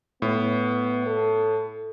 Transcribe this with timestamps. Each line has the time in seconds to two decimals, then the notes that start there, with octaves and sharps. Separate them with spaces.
0.22 A2 B3
1.06 A4